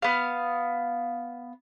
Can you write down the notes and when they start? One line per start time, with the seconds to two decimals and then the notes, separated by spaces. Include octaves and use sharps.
0.02 B3 F5